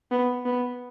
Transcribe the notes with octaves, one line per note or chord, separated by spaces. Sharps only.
B3
B3